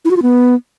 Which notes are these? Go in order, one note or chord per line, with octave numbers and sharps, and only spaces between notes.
E4
F#4
F4
B3